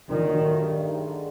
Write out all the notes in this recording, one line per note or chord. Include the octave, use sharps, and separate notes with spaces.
A#2 D#3
F#3
A3
G2
D#3
G#3
D3